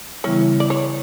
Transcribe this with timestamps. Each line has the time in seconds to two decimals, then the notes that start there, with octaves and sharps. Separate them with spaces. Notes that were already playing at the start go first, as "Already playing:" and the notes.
0.24 C#3 E3 G3 B3 E4 C#5
0.60 D5
0.70 C#5